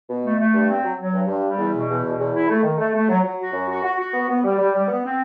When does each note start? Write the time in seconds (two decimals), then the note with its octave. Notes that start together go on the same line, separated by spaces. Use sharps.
0.08 B2
0.23 A3
0.38 A3
0.53 G2
0.69 C4
0.84 F#3
0.97 F#3
1.13 G2
1.27 G2
1.44 G3
1.58 E2
1.73 B2
1.88 E2
2.04 B2
2.18 E2
2.33 E4
2.48 A3
2.63 D#3
2.77 A3
2.94 A3
3.09 F#3
3.23 F#3
3.38 F#4
3.53 F#2
3.69 F#4
3.83 F#4
3.98 F#4
4.14 B3
4.28 B3
4.44 G3
4.59 G3
4.74 G3
4.88 B3
5.04 C4